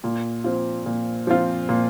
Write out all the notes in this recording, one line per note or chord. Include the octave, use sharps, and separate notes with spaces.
A#2
F3 C4 F4
A#2
F3 C4 F4
A#2